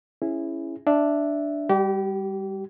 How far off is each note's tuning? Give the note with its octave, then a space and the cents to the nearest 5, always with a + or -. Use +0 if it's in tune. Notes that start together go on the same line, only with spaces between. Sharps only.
C#4 -10 E4 +0 G#4 -5
D4 +0 E5 +0
G3 +20 G4 -30